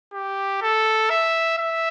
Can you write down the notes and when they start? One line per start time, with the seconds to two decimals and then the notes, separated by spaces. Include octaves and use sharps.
0.13 G4
0.62 A4
1.10 E5
1.58 E5